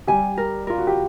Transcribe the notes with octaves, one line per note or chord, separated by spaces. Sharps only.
G3 G4 G#5
A#4
F4 A#4
F#4
G4